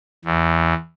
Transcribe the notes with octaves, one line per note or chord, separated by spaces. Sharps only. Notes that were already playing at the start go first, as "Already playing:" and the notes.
E2